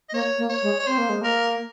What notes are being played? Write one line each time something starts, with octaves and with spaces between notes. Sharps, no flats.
D#5
A#3 C#5
A#3
C#5
G#3
C#5
C4 C5
A#3
G#3
A#3 A#4